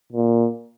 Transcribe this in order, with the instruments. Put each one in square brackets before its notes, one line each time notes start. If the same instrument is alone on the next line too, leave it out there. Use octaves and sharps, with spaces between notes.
[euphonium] A#2